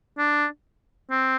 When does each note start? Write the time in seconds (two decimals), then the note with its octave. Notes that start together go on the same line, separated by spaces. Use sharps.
0.18 D4
1.11 C4